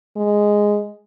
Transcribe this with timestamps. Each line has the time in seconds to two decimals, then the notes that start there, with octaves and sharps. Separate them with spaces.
0.17 G#3